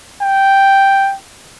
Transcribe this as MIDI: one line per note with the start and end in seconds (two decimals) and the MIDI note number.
0.21 1.15 79